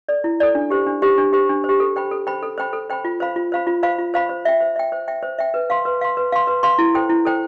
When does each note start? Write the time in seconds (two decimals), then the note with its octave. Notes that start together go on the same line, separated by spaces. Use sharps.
0.09 A4 D5
0.24 E4
0.40 A4 D5
0.55 D4
0.70 G4 C5
0.87 D4
1.02 G4 C5
1.18 D4
1.33 G4 C5
1.49 D4
1.64 C5
1.69 G4
1.80 A4
1.96 C5 G5 B5
2.11 A4
2.27 C5 G5 B5
2.43 A4
2.58 C5 G5 B5
2.73 A4
2.90 C5 G5 B5
3.05 F4
3.20 C5 F5 B5
3.36 F4
3.52 C5 F5 B5
3.67 F4
3.83 C5 F5 B5
3.98 F4
4.14 C5 F5 B5
4.29 C5
4.45 E5 G5
4.60 C5
4.76 E5 G5
4.92 C5
5.08 E5 G5
5.23 C5
5.38 E5 G5
5.54 B4
5.70 F5 C6
5.85 B4
6.01 F5 C6
6.17 B4
6.32 F5 C6
6.47 B4
6.63 F5 C6
6.78 E4
6.95 A4 C5 G5
7.09 E4
7.25 A4 C5 G5